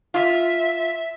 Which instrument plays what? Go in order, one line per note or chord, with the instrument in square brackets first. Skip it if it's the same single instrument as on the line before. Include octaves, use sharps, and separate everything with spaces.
[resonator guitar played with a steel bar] F4 [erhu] E5